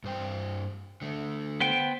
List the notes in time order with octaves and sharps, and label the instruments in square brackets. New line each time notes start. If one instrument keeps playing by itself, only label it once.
[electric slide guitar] G2 C5 G5
D3 A3
[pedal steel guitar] B3 C5 G5